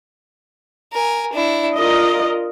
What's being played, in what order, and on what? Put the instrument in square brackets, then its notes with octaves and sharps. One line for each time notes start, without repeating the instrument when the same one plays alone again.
[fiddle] A#4 G#5
D4 E4
[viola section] F4 A#4 D#5 [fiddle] D5